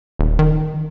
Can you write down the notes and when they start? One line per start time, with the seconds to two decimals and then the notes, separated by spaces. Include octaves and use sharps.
0.19 D#1
0.39 D#3